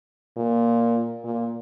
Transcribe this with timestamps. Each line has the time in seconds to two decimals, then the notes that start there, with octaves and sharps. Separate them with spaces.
0.37 A#2
1.24 A#2